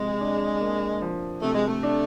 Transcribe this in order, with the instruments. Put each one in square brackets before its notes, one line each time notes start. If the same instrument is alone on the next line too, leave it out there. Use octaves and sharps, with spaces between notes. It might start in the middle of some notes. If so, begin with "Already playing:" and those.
Already playing: [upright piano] C3 F3 [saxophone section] G#3
[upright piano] D4
A#3
F3
[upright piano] C3 [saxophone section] A3
[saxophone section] G#3
A3
[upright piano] D4